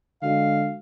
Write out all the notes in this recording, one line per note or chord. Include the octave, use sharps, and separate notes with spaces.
D3 G#3 F#4 D#5 F5